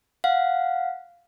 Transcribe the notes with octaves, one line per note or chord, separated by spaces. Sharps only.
F5 F#5